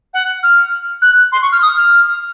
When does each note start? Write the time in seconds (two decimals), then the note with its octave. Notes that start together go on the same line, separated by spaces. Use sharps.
0.14 F#5
0.43 F6
1.02 F#6
1.32 C6
1.42 C#6
1.52 F6
1.62 D#6
1.77 F6